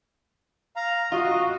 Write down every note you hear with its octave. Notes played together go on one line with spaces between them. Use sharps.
F5 A#5
F4 F#4 D#5